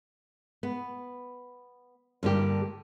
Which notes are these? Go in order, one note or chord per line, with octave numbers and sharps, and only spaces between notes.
B3
G2 D3 A#3 G4